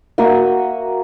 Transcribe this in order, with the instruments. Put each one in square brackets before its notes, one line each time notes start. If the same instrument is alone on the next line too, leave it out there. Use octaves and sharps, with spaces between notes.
[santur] A#3 F#4 E5 D#6